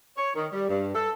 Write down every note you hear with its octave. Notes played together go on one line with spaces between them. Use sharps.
C#5
D#3
G3
G2
A4